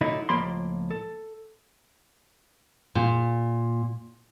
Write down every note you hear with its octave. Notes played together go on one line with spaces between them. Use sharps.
D3 F#3 A3 D#4 E4
C#2 A2 F3 A#3 B5 C6
A4
A#2